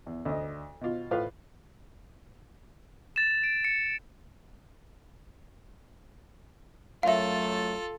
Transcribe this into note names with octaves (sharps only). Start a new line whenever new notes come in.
E2
D2 D#5
B2 F4
A2 F4 B4 F5
A6 E7
D7
C#7
F#2 F#3 A3 F4 A4 E5 F5